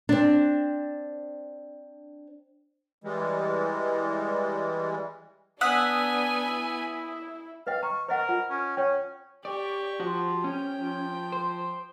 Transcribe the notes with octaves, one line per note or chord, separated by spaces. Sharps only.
C4 D4
E3 G3 G#3
B3 D4 F#5 G#5 D#6 E6 B6
E4
B4 D#5 F5 G5
A#5 C#6
A#4 C5 D#5 F#5
F4
C#4
C#4 C#5 G5
G4 D5 C#6
F3 F#4
C#4 G5
F3
C5